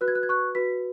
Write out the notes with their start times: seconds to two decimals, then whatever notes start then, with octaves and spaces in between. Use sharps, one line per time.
0.01 F#4 B4 F#6
0.08 G#6
0.15 F#6
0.23 G#6
0.29 C#6 F#6
0.55 F#4 B4 B6